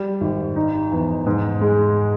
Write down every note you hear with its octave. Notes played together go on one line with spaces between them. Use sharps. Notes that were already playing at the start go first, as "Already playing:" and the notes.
Already playing: G3
G#1
D#4
E2
G#2
G#3